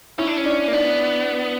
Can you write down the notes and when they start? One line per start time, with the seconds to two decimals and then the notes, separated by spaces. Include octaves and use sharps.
0.18 C#4 E4
0.27 D4
0.37 C#4
0.45 D4
0.68 A#3
0.73 B3 D4